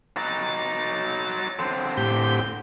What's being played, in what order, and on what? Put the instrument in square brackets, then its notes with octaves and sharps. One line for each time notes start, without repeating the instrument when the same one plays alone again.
[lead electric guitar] F#3 D#4 [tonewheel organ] A6
[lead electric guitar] D3 C4
[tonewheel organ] A2 G4 G6